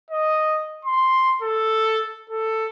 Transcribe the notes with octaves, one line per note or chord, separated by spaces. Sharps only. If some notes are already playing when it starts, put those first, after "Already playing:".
D#5
C6
A4
A4